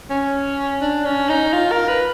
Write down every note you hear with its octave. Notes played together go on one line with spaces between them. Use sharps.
C#4
D4
C#4
D#4
F4
A#4
B4